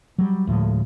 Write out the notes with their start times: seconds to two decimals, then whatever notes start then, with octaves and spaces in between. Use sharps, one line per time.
0.18 F#3 G3
0.47 D2 A2 F3 G#3